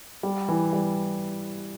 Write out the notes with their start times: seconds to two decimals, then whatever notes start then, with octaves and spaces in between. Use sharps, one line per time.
0.23 G3
0.48 E3
0.73 G3